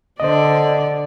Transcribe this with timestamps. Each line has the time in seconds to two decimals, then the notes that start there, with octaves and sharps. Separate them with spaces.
0.20 D3 C5 D5 D#5